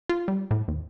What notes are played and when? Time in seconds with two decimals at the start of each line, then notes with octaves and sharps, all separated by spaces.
0.09 F4
0.28 G3
0.51 A2
0.68 D#2